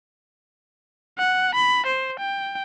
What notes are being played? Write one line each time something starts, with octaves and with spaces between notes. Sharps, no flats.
F#5
B5
C5
G5